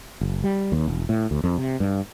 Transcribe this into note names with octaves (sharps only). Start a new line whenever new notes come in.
F#1
G3
D#2
E1
A2
D2
F2
C3
G2